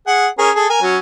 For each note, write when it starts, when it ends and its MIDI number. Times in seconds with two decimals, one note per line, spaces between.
0.07 0.27 68
0.07 0.27 78
0.39 0.50 61
0.39 0.50 68
0.39 0.50 70
0.56 0.69 68
0.56 0.69 69
0.70 0.82 70
0.70 0.82 80
0.82 0.98 54
0.82 0.98 61